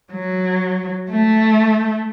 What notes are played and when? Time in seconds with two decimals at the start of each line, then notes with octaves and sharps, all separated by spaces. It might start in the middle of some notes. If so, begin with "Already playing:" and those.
0.13 F#3
1.10 A3